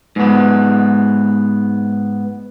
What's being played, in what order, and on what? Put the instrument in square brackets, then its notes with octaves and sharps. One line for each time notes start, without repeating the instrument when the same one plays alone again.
[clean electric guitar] G#2 B3